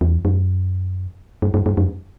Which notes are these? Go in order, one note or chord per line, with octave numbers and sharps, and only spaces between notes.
E2
F#2
G2
G2
G2
F#2